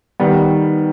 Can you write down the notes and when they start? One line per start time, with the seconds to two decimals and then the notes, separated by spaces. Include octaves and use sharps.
0.20 D#3 G3 B3